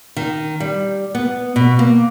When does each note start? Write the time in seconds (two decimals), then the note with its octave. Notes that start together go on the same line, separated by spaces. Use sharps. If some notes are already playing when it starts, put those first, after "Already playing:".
0.16 D#3
0.60 G3
1.15 B3
1.56 B2
1.79 A#3